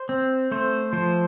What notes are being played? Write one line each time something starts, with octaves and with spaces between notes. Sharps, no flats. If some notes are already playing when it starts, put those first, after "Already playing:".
Already playing: C5
C4
A3 C5
F3 C5